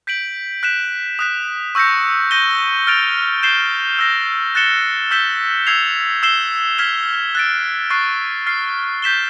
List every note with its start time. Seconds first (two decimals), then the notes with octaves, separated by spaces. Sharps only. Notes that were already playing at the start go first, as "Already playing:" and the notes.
0.07 G6 B6 D7 F#7
0.63 F#6 B6 E7
1.19 D#6 F#6 B6
1.75 C#6 E6 G6 A#6 C#7
2.31 G6 A#6 D#7 G7
2.87 F6 A6 D7 F7
3.43 G6 C7 E7 G7
3.99 E6 G6 A#6
4.55 F#6 A6 C#7 E7 G7
5.11 E6 G6 B6 E7 G7
5.67 E6 G#6 C7 F7
6.23 E6 G#6 C7 E7 G7
6.78 F6 G#6 B6 E7 G7
7.35 F#6 A6 D7
7.90 C#6 F#6 A6 C7
8.47 F6 A6 C7
9.02 G6 B6 E7 G7